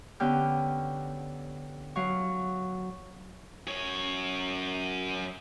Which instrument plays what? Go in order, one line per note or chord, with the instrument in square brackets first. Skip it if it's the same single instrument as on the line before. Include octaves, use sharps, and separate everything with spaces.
[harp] D3 B3 C#4 G4 G5 F6
F#3 F5 C#6
[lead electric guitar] F#2 C#5